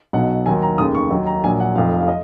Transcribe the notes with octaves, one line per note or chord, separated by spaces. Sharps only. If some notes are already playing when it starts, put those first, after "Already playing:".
B1 B2 F#3 F#5
D#2 D#3 F#3 G#5
A#5
F1 D#2 C#3 D#6
C#6
D#2 D#3 F#3
A#5
A#1 A#2 F#3 G#5
F#5
F1 F2 F3 F5
F5
D#5